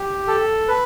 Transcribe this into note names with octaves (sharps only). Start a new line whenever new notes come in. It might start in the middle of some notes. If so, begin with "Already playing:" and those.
Already playing: G4
A4
B4